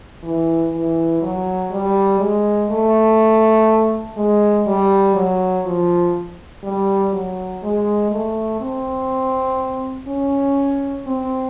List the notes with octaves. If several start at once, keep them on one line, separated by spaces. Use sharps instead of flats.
E3
E3
F#3
G3
G#3
A3
G#3
G3
F#3
F3
G3
F#3
G#3
A3
C4
C#4
C4